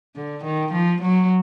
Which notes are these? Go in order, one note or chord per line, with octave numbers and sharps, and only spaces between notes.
D3
D#3
F3
F#3